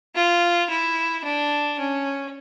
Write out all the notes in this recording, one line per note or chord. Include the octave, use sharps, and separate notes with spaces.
F4
E4
D4
C#4